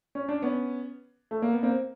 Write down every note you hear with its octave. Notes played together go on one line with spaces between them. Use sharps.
C#4
D4
B3 C#4
A3
A#3
B3
A#3 C4